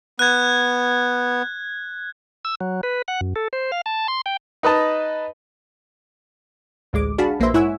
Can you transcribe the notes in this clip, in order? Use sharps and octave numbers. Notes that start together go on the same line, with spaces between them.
B3 F#6 G#6
E6
F#3
B4
F#5
F#2
A4
C5
F5
A5
C6
G5
D#4 B4 D#5 A5
A1 D2 G#3 D6
D4 F#4 G#4 F5 A5 B5
A#1 A#3 B4 C5 E5 C6
G#2 E4 C#5 F#5 G#5 E6